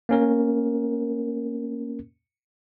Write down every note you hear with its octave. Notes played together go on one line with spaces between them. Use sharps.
A#3 C#4 A#4